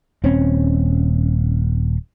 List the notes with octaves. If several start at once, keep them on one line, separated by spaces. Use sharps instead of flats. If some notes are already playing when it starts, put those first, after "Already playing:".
D#1 C4 C#4